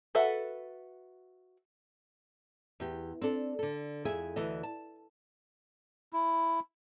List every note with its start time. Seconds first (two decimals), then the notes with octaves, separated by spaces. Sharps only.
0.15 F#4 A4 B4 E5 F#5
2.80 E2 G4
3.21 C4 D4 A4
3.59 D3 A4
4.05 F2 E4 G#4 E5 G#5
4.36 D2 E3 A4 D#5
4.63 A5
6.13 E4